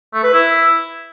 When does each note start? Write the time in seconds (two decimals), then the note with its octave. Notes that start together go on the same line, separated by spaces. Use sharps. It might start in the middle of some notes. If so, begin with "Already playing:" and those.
0.14 A3
0.24 B4
0.34 E4